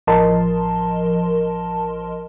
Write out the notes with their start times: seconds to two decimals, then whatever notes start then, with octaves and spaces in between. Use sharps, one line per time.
0.07 A1 F3 A#4 D#5 A5 C6